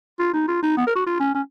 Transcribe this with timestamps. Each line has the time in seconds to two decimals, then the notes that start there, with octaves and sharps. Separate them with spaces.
0.19 F4
0.33 D#4
0.48 F4
0.63 D#4
0.77 B3
0.87 A#4
0.96 F#4
1.06 F4
1.20 C#4
1.35 C#4